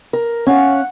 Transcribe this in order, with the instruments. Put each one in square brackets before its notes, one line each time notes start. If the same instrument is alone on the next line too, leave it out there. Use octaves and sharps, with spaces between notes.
[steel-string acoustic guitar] A#4
[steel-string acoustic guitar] C#4 F5 [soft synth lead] F#5